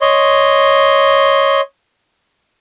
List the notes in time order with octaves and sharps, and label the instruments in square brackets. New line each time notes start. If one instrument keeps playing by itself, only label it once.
[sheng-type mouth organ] C#5 D#5 C6